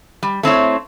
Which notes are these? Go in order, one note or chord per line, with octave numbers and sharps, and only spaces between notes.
G3
A3 C4 E4 C#5